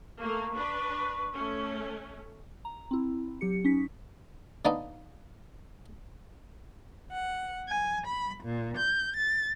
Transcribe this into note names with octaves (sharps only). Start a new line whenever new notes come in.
A3 A#3 C#6
D4 B4
A3 C#4
A#5
C4 E4
F#3 G4 C#7
C#4 D#4 B6
D3 A#3 B3 D4 D#4
F#5
G#5
B5
A#2
G6
A6